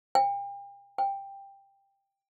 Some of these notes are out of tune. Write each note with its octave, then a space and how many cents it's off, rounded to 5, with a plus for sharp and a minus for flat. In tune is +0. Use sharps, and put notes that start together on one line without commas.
G5 +35
G5 +10